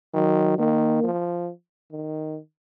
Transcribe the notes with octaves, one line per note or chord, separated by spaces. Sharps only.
D#3 F#3
D#3 A#3
F3
D#3